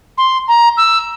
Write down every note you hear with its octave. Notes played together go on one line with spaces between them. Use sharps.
C6
A#5
E6